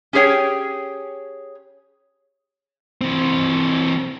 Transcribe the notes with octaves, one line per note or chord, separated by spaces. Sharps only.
C#4 G4 G#4 C#5 G5
E3 C4